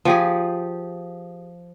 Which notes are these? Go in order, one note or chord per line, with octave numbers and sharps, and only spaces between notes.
F3 G4 G#4